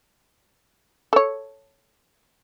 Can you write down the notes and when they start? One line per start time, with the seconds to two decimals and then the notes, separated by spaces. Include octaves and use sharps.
1.13 A4 C#5